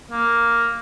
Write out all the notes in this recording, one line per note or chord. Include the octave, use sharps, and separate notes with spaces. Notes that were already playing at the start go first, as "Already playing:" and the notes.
A#3